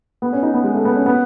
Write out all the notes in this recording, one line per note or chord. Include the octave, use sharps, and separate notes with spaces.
B3
C#4
D#4
B3
G#3
A3
B3
C#4
B3